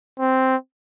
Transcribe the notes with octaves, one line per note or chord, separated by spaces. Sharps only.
C4